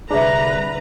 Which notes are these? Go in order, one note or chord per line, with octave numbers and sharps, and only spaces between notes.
C2 D3 G3 D4 G#4 B4 E5 A#5